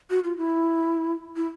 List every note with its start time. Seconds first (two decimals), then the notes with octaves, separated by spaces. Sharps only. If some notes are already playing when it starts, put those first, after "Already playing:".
0.10 F#4
0.24 F4
0.37 E4
1.36 E4